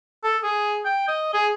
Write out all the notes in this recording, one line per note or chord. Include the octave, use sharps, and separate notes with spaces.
A4
G#4
G5
D#5
G#4